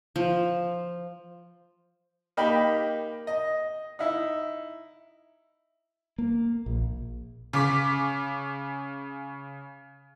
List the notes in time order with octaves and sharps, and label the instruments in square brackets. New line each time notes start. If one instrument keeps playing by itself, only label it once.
[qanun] F3
[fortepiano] A#3 D#4 G4 G5 B5
D#5
D#4 E4
[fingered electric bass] A#3
A#1
[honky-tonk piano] C#3 D6 B6